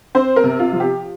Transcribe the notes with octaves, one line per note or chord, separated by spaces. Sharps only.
C4 C5
A#4
C3
F4
F3
G4